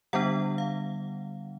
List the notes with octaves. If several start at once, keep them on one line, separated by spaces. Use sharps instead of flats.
D3 G3 B3 D4 F#5
F5